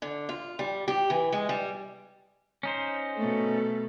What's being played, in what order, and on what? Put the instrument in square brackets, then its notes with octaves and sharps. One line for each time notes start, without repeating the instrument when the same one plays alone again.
[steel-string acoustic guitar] D3
F4
G3
G4
E3
G#3
G3
[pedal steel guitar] C#4 D#4 C5
[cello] B2 A4 [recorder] A3